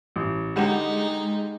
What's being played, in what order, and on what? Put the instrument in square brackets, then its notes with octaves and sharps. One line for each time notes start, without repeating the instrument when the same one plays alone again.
[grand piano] A1
[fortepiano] D3 G3 G4 [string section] G#3 [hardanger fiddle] D#4 [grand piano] F#5